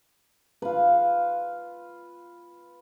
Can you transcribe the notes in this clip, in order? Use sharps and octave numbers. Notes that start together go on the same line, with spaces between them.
F4 B4